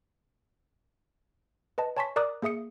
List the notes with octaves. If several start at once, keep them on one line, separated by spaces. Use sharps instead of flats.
B4 D#5 A5
C#5 G#5 A5 C6 C#6 B6
A#4 D5 A#5 D6 D#6 F#6
A#3 G#4 E5 D#6 C#7